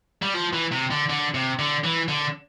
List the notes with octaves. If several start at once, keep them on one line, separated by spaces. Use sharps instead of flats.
G3
F3
E3
C3
D3
D3
C3
D3
E3
D3